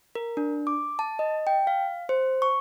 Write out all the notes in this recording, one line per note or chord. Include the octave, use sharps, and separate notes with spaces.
A#4
D4
D6
A5
D#5
G5
F5
C5
C#6